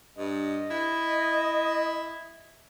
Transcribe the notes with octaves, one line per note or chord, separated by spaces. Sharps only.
G2 D#5
E4